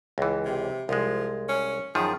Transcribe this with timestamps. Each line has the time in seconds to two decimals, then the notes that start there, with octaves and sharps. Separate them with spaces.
0.18 C#2 E3
0.45 C3
0.89 C2 F3 G#3
1.49 C#4
1.95 F#2 D#3 F3 G#4